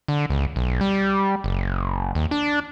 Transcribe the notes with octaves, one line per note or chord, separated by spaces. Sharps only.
D3
C#2
B1
G3
F#1
D#2
D4